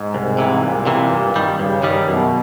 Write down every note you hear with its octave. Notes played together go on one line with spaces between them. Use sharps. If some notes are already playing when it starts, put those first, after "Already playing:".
Already playing: G#2
C2
C3 E3
C2 A#2
C3 E3
G2
D#3 G3
G2 C#3
D#3 G3
F#2 B2